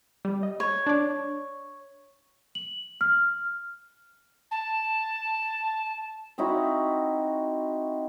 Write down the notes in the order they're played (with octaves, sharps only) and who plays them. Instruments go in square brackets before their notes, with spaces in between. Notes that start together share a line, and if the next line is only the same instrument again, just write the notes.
[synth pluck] G3
D#5
[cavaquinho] C#5
[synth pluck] D4 D5
[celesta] F#7
F6
[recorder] A5
[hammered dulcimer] C4 D#4 E4 F#4